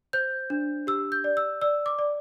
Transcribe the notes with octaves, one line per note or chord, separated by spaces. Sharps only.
C5 G6
D4
G4 E6
G6
D5
E6
D5 E6
D6
D5